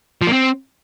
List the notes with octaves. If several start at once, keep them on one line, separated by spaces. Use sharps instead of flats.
F3
A#3
C4